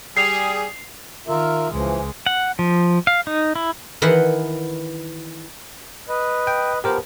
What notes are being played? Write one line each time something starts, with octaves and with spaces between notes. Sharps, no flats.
G3 G#4 C7 F7
D#3 F4 A#4 E5
C#2 E3 F3 G#3
F#5
F3
F5
D#4
E4
D#3 E3 B4 F#5 C6
B4 D#5
G5
F3 B3 G4 A#4 C5